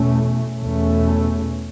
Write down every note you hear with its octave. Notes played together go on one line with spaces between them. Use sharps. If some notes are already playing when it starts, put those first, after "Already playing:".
Already playing: E2 B2 A3 C#4
E2 B2 A3 C#4